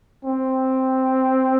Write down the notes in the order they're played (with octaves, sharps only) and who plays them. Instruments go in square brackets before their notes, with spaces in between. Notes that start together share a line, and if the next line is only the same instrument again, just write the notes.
[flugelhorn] C4